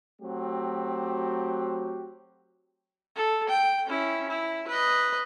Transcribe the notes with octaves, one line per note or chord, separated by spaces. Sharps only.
F#3 A3 C4 F#4 G4
A4
G5
C#4 E4
E4
B4 D#5